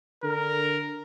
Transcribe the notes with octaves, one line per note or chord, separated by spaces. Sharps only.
D3 A#4